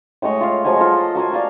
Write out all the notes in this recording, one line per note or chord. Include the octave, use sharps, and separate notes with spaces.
A2 G#3 C#5 D#5
F4 F5
F3 F#3 G#3 G#5
F4 A4 D#5
F#4 A#4 D#5 G#5
D5 F5 A5